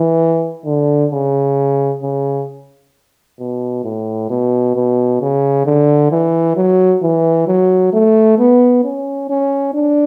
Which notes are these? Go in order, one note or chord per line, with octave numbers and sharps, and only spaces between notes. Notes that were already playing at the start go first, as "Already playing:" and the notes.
Already playing: E3
D3
C#3
C#3
B2
A2
B2
B2
C#3
D3
E3
F#3
E3
F#3
A3
B3
C#4
C#4
D4